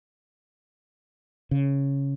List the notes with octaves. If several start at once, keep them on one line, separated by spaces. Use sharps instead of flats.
C#3